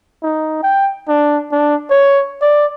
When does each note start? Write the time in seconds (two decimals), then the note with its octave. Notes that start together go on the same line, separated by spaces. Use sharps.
0.23 D#4
0.63 G5
1.08 D4
1.52 D4
1.90 C#5
2.42 D5